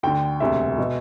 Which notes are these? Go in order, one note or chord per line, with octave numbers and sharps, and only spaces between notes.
D2 D3 G5
E1 D2 C3 E5
B2